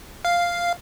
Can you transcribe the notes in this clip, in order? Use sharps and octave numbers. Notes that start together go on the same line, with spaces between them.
F5